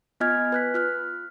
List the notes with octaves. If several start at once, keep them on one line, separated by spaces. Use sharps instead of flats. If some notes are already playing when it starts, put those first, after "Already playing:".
B3 F4 D#5 G#5 F6 G#6
B4 F#6 B6
F4 F6 F#6